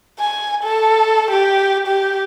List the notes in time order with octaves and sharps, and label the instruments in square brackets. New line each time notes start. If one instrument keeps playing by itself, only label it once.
[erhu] G#5
A4
G4
G4